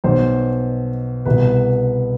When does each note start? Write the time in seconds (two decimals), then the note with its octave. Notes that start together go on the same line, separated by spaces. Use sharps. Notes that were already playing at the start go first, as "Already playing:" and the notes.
0.04 B1 B2 C5
1.25 C2 B2 B4